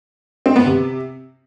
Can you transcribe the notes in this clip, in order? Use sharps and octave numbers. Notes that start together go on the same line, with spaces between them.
C4
B3
C3